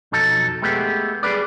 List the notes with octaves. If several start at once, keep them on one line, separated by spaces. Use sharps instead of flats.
B1 F2 F#3 D#4 A4
G#3 A3 B3 G4
G3 G#4 A#4 B4 D5